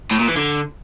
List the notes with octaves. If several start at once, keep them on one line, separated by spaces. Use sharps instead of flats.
A2
A#2
E3
D3